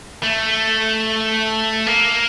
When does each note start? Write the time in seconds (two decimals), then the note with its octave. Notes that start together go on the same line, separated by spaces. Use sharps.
0.23 A3
1.87 A#3